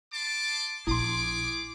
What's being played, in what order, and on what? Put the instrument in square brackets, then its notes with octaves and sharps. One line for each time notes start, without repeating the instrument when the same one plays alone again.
[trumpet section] A5 C6 D6
[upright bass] A#1 [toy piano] E4 C6 [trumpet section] G#4 D6